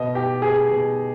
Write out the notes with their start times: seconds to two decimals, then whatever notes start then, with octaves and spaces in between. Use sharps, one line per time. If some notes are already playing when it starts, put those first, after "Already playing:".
Already playing: B2 D#5
0.15 G4
0.42 G#4
0.69 B2